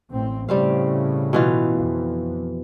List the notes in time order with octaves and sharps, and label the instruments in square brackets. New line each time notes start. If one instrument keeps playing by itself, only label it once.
[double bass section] A1 C4
[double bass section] A2 C#3 [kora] G3 C4 F5
[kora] B2 E3 F4
[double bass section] F2